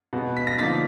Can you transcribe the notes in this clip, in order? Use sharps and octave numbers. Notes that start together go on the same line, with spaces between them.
B2 G#3 B3
B6
A#6
D3 F3 A#3 D#4 A6 B6